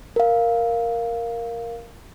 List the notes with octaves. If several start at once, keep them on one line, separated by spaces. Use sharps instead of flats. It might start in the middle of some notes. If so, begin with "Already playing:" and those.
A#4 F5